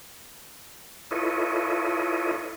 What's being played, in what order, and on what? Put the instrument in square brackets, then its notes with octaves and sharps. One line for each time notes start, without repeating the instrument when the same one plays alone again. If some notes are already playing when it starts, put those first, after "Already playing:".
[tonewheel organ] E4 F4 A4 B4 C#5 D#5